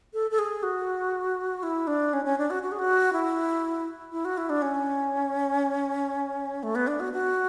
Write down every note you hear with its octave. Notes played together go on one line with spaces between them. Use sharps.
A4
A4
G#4
F#4
E4
D4
C#4
C#4
D4
F#4
F#4
G#4
F#4
E4
E4
F#4
E4
D4
C#4
A3
B3
D4
F#4
F#4